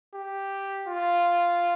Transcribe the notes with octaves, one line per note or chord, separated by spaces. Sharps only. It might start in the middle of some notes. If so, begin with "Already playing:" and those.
G4
F4